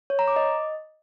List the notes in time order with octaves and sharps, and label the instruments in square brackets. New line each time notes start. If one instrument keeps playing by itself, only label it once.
[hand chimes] C#5
A#5
D6
D#5